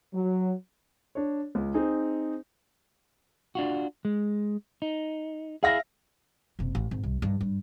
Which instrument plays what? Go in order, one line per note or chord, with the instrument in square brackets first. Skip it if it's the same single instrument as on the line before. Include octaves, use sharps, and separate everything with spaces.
[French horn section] F#3
[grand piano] D4 C#5
C#2
C4 D#4 G#4
[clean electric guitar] D4 F4 F#4
G#3
D#4
[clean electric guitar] E4 G#4 [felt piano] E5 F5 A#6
[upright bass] F#1 C3
A1
G#1
C2
G2 D#3
G2